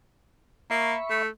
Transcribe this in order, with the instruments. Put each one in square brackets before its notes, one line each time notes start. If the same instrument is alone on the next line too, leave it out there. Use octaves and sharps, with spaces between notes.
[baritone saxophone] A#3 [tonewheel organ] E5 B5 C#6
[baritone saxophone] A3